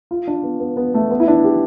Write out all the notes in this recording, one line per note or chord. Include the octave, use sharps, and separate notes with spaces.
F4
D4
B3
B3
B3
A3
B3
E4
D4
G4